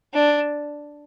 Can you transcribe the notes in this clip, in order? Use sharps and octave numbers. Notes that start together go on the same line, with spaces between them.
D4